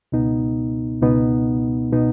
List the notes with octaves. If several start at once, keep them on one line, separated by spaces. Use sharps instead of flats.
C#2 B2 B3 D#4
C#2 B2 B3 D#4
B2 B3 D#4